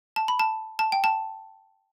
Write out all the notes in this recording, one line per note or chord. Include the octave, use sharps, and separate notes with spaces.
A5
B5
A5
A5
G5
A5